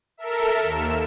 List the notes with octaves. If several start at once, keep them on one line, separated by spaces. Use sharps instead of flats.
A4 A#4 E5
D#2 E7